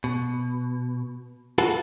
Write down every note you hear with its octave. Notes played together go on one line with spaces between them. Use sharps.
B2
F4 F#4 A4 B4